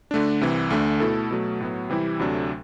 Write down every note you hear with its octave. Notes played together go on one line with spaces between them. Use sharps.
D3 A3 D4
C2 C3 E3
D2 D3 A3 D4
B2 A3 E4 A4
B2 F#3 A3
A2 F#3 B3
C3 E3 G3 C4 E4
D2 C3 F#3 A3 D4